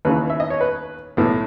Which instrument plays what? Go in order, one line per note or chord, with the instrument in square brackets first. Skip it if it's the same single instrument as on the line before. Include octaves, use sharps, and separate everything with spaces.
[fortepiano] D#2 C#3 E3 B4
E5
D#5
C#5
B4
B1 A2 E3